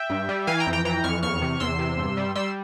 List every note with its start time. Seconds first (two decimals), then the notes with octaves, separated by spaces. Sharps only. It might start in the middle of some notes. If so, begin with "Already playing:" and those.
Already playing: E5 G5
0.10 G2
0.29 G3
0.47 E3 F5 G#5
0.60 G5 A#5
0.66 F2
0.73 G5 A#5
0.85 E3 G5 A#5
1.04 F2 C#6 F6
1.23 E2 C#6 F6
1.42 C3
1.60 E2 C6 E6
1.79 C3
1.98 G2
2.17 G3
2.35 G3 C6 E6